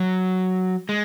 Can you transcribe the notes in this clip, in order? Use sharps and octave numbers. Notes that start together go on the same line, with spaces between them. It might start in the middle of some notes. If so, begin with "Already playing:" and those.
Already playing: F#3
G#3